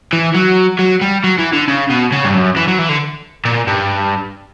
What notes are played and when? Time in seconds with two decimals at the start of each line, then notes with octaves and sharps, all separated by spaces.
0.13 E3
0.35 F#3
0.79 F#3
1.01 G3
1.24 F#3
1.38 E3
1.53 D3
1.68 C#3
1.90 B2
2.12 C#3
2.24 G2
2.34 F#2
2.57 E3
2.68 F#3
2.79 E3
2.89 D3
3.45 A#2
3.67 G2